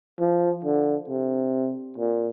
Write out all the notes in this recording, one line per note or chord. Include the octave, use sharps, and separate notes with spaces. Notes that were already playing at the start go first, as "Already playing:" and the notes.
F3
D3
C3
A#2